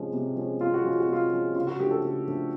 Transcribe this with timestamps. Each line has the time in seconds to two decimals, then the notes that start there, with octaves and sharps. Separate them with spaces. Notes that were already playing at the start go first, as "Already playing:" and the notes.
Already playing: C3 F3 G#3 C#4
0.13 C3
0.36 F3 G#3 C#4
0.61 C3 F4
0.74 F#4
0.84 F3 G#3 C#4 F4
1.00 F#4
1.08 C3 F4
1.31 F3 G#3 C#4
1.55 C#3 F4
1.67 F#4
1.80 F3 A3 D4 G4
1.91 A4
2.03 C#3
2.27 F3 A3 D4